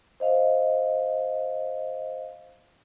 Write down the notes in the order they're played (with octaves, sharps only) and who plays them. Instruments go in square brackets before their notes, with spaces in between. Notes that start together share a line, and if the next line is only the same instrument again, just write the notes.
[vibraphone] C5 D#5 F5